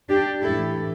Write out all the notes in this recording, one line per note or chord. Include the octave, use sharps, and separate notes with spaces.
D4 G4
A2 E3 A3 E4 A4